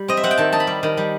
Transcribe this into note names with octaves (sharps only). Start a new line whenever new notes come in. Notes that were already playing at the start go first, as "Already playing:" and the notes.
Already playing: G3
C4 D#5
E5
C4 F#5
G5
D#3 A5
D#4 A5
B5
G3
D#3
G3